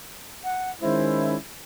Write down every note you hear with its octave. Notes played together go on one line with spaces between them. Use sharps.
F#5
D#3 G#3 C#4 E4 C5